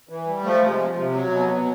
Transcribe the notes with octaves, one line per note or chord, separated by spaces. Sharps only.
E3
G3
F3 A3
C3
G#3
F3
C3
F#3
B2
F#3